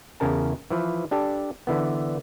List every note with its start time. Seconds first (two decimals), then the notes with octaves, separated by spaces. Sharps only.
0.20 E2 C#3 C#4 A#4 A5
0.70 E3 F3 B4
1.11 D4 G4 A4
1.67 D3 E3 B3